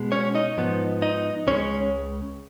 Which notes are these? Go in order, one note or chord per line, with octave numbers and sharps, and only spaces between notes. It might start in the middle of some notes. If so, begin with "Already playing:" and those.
Already playing: B2 G#3
C#4 C#5
D#4 D#5
G#2 F3 B3
D#4 D#5
C#2 C#3 G#3 C#4 C#5